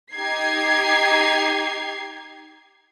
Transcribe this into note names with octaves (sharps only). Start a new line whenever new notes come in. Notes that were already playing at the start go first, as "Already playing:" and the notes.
D#4 G4 G#6 C7